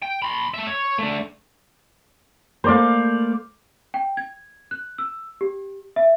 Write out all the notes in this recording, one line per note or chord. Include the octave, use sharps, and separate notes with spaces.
G5
B5 C6
A3 E5
C#5
A3 D4
A3 A#3 C5 D5 F5
G5
G#6
F#6
E6
G4
E5